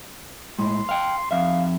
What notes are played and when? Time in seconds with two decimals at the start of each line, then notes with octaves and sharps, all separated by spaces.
0.59 A2 G#3 C6
0.89 F5 G5
1.31 F2 E5 F5